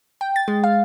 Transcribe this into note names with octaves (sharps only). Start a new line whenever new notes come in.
G5
A6
G#3
F5